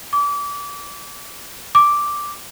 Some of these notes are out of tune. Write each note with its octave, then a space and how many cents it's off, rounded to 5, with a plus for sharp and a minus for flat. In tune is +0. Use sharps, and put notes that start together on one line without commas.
D6 -30
D6 -5